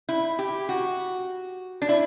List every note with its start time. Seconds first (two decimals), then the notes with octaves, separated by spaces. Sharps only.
0.09 E4
0.39 G4
0.69 F#4
1.82 D4
1.89 E4